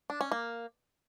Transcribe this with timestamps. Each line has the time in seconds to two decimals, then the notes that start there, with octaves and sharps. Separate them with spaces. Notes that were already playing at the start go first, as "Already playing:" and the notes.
0.10 D4
0.21 C#4
0.32 A#3